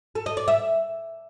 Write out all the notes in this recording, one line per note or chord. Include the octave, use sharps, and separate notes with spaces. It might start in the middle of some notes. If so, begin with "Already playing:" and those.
A4
D#5
D5
E5